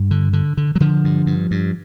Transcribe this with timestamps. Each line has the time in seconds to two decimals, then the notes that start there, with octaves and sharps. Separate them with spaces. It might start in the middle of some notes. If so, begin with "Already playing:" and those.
Already playing: G2
0.11 D3
0.33 D3
0.57 D3
0.76 F#3
0.80 D3 F3
1.04 G2
1.27 G2
1.51 G2